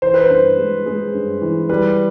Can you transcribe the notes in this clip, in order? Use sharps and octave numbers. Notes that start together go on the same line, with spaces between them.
E3 C5
B4
G2 C5
G#3
G#3
G2
E3
G3 B4